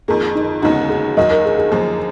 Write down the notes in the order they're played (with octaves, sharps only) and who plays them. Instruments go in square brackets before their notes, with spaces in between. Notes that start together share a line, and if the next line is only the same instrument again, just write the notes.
[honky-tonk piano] F2 D#3 A#3 [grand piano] G#4
[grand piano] D#4
[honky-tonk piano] D#2 C#3 G#3 B3 F#4 [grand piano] D#4
[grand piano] G#4
[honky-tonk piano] D#2 D#3 F#3 [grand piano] D#5
[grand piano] A#4
G#4
G#4
[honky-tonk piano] F#2 F3 A#3 [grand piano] G#4